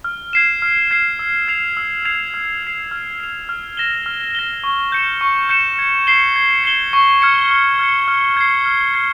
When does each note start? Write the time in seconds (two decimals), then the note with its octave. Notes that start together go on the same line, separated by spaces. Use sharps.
0.04 F6
0.33 G#6 C7 E7
0.62 F6
0.91 G#6 C7 E7
1.19 E6
1.48 G#6 C7 F7
1.77 E6
2.05 G#6 C7 F7
2.34 F6
2.62 C7 F7
2.91 F6
3.20 C7 F7
3.49 F6
3.77 A#6 E7 G7
4.06 F6
4.35 A#6 E7 G7
4.64 C#6
4.92 G6 C#7 E7
5.21 C#6
5.49 G6 C#7 E7
5.79 G#6
6.07 C7 E7 G7
6.36 G#6
6.64 C7 E7 G7
6.93 C#6
7.22 F6 G#6 C#7
7.51 C#6
7.79 F6 G#6 C#7
8.08 F6
8.37 G#6 C7
8.66 F6
8.94 G#6 C7